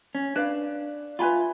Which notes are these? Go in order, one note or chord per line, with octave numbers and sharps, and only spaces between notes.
C#4
D4 B4 D5 F5
F4 B4 E5 G#5 B5